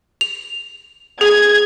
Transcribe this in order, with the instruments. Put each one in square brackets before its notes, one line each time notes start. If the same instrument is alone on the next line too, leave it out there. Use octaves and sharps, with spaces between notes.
[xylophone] F7
[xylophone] G#4 [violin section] G#6